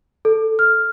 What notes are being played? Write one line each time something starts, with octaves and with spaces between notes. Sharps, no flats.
A4
F6